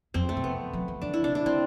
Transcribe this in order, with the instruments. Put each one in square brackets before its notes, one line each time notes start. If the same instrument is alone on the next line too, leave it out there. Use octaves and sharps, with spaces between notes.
[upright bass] F2 [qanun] C4
[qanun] A3
[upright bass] C3
[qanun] B3
[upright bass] F3
E3
[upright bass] D3 [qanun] D4
[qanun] E4
[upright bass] C3 [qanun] D4
[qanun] D4
[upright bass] D3 [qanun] C4